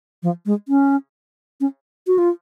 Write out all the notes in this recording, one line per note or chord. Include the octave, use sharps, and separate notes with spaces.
F3
G#3
C#4
C#4
F#4
F4